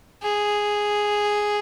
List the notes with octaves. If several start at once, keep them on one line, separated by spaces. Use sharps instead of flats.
G#4